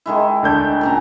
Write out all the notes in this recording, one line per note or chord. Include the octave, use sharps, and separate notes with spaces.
D#3 G#3 E4
D2 D4 G6
A#2 C#3 A#5